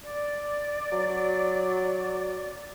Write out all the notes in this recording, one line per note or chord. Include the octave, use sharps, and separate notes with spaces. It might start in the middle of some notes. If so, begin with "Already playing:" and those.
D5
F#3